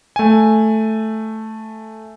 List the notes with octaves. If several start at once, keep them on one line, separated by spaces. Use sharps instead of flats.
A3 G#5